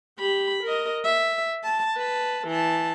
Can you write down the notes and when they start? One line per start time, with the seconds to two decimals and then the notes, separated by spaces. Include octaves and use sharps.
0.19 G4 B5
0.63 A#4 D#5
1.04 E5
1.64 A5
1.96 B4 A5
2.47 E3 A5